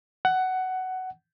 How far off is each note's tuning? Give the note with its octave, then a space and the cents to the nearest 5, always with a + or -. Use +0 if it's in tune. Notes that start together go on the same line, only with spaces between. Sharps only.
F#5 +15